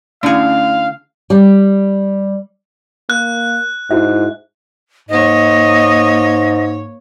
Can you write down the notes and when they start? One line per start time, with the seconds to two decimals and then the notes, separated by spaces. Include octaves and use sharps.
0.23 D3 A3 C#4 E4 G#4 F5
1.30 G3
3.10 A#3 F#6
3.91 G#2 E4 F#4 E5
5.09 G#2 A#3 C#5 D#5